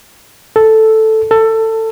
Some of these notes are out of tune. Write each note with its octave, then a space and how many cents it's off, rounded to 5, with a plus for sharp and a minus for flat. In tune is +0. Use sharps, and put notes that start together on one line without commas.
A4 +0
A4 +20